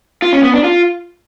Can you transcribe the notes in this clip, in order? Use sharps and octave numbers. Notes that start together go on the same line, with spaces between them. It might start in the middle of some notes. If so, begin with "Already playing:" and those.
F4
C#4
B3
D4
F4